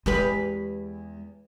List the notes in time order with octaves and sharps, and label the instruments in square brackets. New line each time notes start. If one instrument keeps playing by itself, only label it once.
[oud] E2 G4 B4 [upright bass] G#3